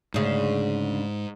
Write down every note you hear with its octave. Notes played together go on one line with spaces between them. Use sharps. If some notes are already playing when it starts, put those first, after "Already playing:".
D2 G#2 C#3